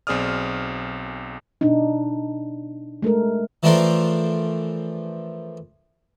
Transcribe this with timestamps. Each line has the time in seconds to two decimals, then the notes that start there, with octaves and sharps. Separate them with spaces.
0.07 B1 C4 G#4 D5 D#6 F6
1.61 B2 D4 D#4
3.02 G#3 A3 A4 A#4
3.63 E3 F3 A3 D4 A#4 C5